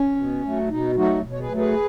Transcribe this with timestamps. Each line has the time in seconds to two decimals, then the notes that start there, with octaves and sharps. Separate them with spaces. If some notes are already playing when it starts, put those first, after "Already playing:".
Already playing: C#4
0.16 B2
0.43 F#3 A3
0.69 B2 D#4
0.95 F#3 A3 D#4 F#4
1.22 B2
1.32 C#5
1.40 G#4 B4
1.48 F#3 A3
1.57 G#4 B4